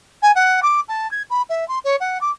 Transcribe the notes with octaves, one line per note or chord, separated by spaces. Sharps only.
G#5
F#5
D6
A5
G#6
B5
E5
C6
C#5
F#5
D6